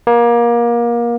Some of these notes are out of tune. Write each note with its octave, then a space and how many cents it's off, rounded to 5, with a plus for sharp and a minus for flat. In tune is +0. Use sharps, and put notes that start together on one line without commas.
A#3 +25